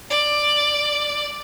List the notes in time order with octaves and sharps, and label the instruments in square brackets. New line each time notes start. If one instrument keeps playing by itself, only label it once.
[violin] D5